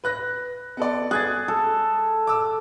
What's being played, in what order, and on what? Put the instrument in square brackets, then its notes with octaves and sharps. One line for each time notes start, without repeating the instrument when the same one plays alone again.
[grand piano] B4 F#6 A#6
B3 A4 D5
[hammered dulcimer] G#4 [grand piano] F#6 G#6 A6
[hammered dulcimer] A4
[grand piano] D6 E6